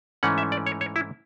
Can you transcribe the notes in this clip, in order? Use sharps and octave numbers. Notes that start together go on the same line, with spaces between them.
G#2 E3 A3 C#4 F#5
E5
D5
C#5
C#5
E4